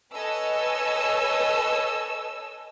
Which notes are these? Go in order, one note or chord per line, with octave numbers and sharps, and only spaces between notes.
A4 B4 C#5 D#5 G#5 E6